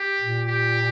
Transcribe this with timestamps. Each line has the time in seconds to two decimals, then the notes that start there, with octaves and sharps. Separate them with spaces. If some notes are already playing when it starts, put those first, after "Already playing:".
Already playing: G4
0.20 A#2
0.47 G4